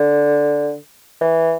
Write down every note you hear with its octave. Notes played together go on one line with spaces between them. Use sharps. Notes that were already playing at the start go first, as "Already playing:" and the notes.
Already playing: D3
E3